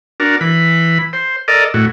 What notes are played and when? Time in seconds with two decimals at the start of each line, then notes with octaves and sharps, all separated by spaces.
0.20 D4 F#4 A#4
0.41 E3 B5
1.13 C5
1.48 A4 A#4 D5 D#5
1.74 A2 F#4